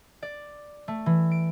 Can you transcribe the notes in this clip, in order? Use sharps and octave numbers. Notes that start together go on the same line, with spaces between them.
D5
A3
E3
D7